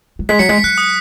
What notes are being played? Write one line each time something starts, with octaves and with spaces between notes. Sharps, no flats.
F#3
G#3 B6
F#3 C#7
G#3 B6
F#3 F#6
D#6